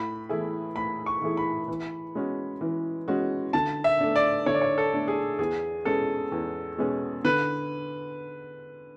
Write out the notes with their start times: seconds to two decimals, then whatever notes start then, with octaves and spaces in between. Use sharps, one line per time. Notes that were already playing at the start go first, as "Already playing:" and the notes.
Already playing: A2 B5
0.29 E3 A3 E4 G#4
0.76 A2 B5
1.06 C#6
1.21 E3 A3 E4 G#4
1.37 B5
1.68 E3
2.15 G#3 C#4 F#4
2.61 E3
3.08 G#3 C#4 F#4
3.53 D3 A5
3.84 E5
4.00 A3 D4
4.16 D5
4.46 D3 C#5
4.54 D5
4.62 C#5
4.78 A4
4.93 A3 D4
5.08 G#4
5.39 E2 G#4
5.85 B2 G#3 C#4 G#4 A4
6.32 E2
6.78 B2 G#3 C#4 G#4
7.24 D3 B4